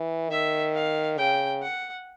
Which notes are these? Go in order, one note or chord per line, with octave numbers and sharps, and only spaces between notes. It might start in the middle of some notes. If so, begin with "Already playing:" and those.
Already playing: E3
D#3 E5
F5
C#3 G5
F#5